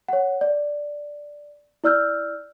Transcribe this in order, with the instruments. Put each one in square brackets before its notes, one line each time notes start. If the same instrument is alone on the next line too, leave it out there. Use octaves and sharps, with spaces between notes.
[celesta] C#5 F#5
D5
E4 D5 E6 F6 G6